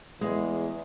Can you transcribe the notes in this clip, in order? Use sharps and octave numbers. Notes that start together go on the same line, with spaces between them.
E2 G#3